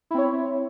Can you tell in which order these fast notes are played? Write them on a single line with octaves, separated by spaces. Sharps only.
E4 C4 C#5